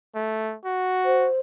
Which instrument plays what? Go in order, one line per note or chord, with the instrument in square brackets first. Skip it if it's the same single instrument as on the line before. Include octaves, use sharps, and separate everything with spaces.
[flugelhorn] A3
F#4
[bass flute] C5